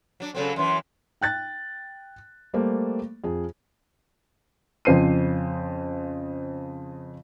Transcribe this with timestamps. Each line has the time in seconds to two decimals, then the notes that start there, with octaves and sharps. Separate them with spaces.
0.20 F#3 D4
0.35 C#3 F#3 C4 A4
0.56 F#2 E3 C6
1.21 G5 F#6 A6
2.54 G3 A3 A#3 C5
3.24 F2 G#4
4.85 F2 C#3 C5 C7 D#7